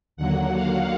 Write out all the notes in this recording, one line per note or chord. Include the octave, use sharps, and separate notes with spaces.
D#2 D3 F#3 A#3 F#5
F5